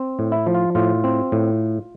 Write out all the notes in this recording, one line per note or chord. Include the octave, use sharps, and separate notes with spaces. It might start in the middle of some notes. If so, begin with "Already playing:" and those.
Already playing: C4
A2
E4
F3
F4
A2 F4
C4
A2